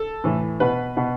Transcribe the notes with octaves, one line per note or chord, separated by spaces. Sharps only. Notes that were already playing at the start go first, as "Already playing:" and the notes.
Already playing: A4
A2 E3
B2 B4
B2